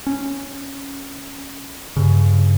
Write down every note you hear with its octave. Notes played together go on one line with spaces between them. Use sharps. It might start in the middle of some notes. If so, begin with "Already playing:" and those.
C#4
G2 C#3